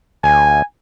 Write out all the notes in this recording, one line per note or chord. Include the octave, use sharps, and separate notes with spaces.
D2 G#5